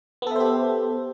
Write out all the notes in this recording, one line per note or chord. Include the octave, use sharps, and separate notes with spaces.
B3 G4 A4 C5 E5